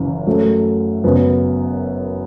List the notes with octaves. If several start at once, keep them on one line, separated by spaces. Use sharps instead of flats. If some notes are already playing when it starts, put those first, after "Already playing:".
Already playing: F#1 F#2 E3
F#2 F#3 A3
F#1 F#2 F#3 B3